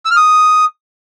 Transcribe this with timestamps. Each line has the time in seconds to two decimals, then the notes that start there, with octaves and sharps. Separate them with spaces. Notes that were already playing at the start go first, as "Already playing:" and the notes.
0.05 E6
0.11 F6
0.17 D#6